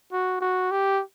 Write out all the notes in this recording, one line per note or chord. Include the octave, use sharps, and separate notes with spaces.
F#4
F#4
G4